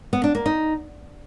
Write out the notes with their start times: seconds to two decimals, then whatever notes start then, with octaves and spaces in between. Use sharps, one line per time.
0.13 B3
0.24 D4
0.35 A#3
0.46 D#4